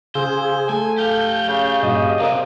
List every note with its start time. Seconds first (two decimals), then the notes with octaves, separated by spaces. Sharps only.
0.15 C#3 F4 G#4 C5 F5 E6
0.69 A3 A4 G#5
0.98 G4 F5 G6
1.48 C#3
1.83 G2 A#2 F#4 D#5
2.20 C#2 C3 A#3 D5